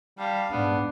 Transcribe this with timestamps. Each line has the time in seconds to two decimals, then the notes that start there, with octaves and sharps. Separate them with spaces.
0.19 G3 F5 A5
0.51 G#2 B3 D4